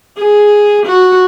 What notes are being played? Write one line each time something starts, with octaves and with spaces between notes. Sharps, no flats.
G#4
F#4